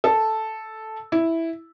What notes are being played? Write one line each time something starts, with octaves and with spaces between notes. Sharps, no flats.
A4
E4